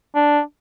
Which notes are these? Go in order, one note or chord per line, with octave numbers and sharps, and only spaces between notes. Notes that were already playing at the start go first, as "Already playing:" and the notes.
D4